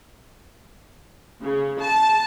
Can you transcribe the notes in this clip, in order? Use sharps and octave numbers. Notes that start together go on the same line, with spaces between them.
C#3
A5